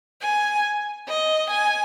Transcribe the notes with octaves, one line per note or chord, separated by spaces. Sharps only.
G#5
D#5
G#5